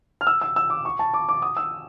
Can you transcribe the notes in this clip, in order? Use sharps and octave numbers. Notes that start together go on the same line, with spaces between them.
F6
E6
E6
E6
D6
C#6
A5
D6
D6
D#6
E6